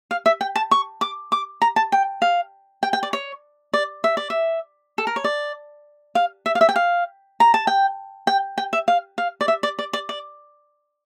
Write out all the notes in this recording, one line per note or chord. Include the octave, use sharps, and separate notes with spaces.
F5
E5
G5
A5
C#6
D6
D6
A#5
A5
G5
F5
G5
G5
D5
C#5
D5
E5
D5
E5
A4
A#4
C#5
D5
F5
E5
F5
E5
G5
F5
A#5
A5
G5
G5
G5
E5
F5
F5
D5
E5
D5
D5
D5
D5